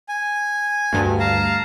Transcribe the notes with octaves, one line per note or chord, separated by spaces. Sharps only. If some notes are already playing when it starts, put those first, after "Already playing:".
G#5
D2 G2
F5 A5 A#5